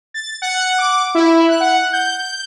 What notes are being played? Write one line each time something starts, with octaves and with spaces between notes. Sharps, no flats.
A6
F#5
D6
E4
F#6
F#5
G6